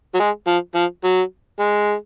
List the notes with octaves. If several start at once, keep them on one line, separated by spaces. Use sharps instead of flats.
F#3
G#3
F3
F3
F#3
G#3